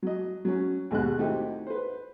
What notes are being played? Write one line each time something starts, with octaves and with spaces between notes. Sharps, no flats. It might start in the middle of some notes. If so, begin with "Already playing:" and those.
F#3 D#5
F#3 C#4
D#2 G#2 B2 G#3 F#6
A3 C4 D#4 E4 F#4 G4
B4 C5